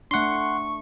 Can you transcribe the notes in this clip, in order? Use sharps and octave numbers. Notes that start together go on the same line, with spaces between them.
A3 D4 F#5 C6 C#6